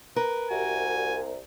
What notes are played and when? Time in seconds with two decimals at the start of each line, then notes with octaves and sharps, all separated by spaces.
0.16 A#4 B4
0.51 C2 F#4 G#5